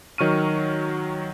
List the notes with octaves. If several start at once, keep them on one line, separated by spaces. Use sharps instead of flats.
D#3 F#3 C#6 F6 D#7